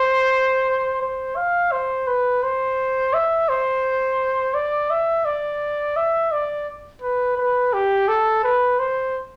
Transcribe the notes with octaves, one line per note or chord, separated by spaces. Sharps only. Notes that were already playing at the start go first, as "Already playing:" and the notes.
Already playing: C5
C5
F5
C5
B4
C5
E5
C5
D5
E5
D5
E5
D5
B4
B4
G4
A4
B4
C5